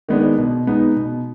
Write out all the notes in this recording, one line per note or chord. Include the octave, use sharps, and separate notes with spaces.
D#3 G#3 B3 D4
B2
G#3 B3 D#4
B2